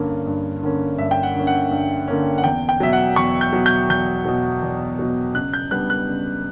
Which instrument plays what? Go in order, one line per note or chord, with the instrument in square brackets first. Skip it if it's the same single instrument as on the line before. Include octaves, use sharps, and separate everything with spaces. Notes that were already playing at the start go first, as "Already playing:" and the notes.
Already playing: [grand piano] G2 D3 A#3 C#4
G2
D3 A#3 C#4
G2 E5
G5
F#5
D3 A#3 C#4
F#5
G2
D3 A#3 C#4
F#5
E2 G5
G5
B2 F#3 E5
F#5
E2 C#6
G6
B2 F#3
G6
E2 G6
B2 F#3
E2
B2 F#3
C#3 F#6
G6
G3 B3 D4 F#6
F#6
C#3